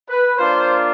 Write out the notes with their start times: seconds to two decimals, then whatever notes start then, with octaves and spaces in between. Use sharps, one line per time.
0.09 B4
0.37 A#3 D4 F4 C5